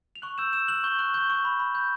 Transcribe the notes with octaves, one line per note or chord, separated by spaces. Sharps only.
F7
C#6 F#6 F#7
E6 G6 E7
E6 G6 E7
E6 F#6 F#7
C#6 G6 G7
C#6 F#6 F#7
C#6 G6 G7
C#6
B5
B5
G6